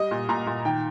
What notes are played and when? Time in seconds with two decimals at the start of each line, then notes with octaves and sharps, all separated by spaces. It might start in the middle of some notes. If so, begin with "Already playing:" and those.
Already playing: G3 D#5
0.11 A#2
0.29 A#2 A#5
0.47 A#2
0.65 D#3 G5